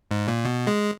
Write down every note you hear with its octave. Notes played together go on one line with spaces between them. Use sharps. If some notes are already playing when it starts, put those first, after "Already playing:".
G#2
A#2
B2
G#3